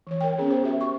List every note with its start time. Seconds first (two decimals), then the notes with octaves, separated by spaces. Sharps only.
0.07 E3 C#5
0.21 A#4 C#5 G5
0.38 B3 C#4 G#4
0.51 C5
0.64 F#4 G4 E5
0.81 C#6